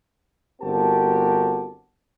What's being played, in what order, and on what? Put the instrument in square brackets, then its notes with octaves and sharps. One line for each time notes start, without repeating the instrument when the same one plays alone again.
[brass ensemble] G1 C4 F#4 G4 A#4 A5